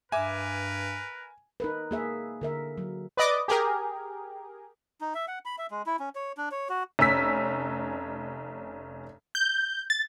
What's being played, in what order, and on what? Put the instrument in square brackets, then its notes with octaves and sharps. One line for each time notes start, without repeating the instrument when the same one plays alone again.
[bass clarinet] G2 [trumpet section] A#4 B4 [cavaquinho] E5 D6 [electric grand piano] G#5
[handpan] D#4 A#4 B4
A#3 G#4 E5
D3 A#4 E5
F#3
[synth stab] B4 D5 D#5 D6
G4 G#4 A#4
[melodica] D#4
E5
F#5
B5
E5
G#3
E4
C#4
C#5
D4
C#5
F#4
[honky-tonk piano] F1 C#4 E6 B6
[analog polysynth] G6
A6